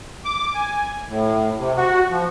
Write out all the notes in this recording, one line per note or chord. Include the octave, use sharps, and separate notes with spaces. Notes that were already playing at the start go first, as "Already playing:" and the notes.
D6
G#5
A2
C3
F#4
F3